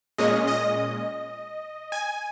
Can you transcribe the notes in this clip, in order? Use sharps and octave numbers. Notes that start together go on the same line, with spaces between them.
A#2 G#3 C#4 D#5
D#5
G#5